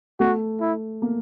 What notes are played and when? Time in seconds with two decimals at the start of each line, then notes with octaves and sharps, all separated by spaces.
0.20 A3 F#4
0.60 E4
1.02 A#3